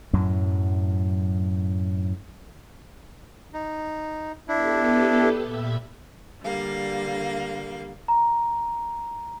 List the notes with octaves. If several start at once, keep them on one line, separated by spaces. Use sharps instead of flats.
F#2 A2 F#3
D#4
B3 D4 E4 G4 A4
A#2 E5 B5
D3 G3 A#3 F5
A#5